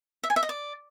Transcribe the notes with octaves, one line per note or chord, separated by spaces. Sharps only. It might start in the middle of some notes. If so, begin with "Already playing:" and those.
E5
G#5
E5
D#5
D5